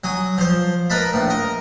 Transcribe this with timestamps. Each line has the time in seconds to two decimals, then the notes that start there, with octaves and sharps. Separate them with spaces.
0.04 F#3 G#5 D#6
0.38 F3 C5
0.90 A#4 B4 D#5 A5 B5
1.13 A#1 A2
1.30 A#4 D#5